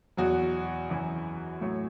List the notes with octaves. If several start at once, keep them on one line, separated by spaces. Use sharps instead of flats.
E2 B2 F#3 F#4
F#2 E3
A2 F#3